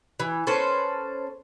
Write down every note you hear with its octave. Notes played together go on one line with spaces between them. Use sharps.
E3
C#4 A4 B4 C5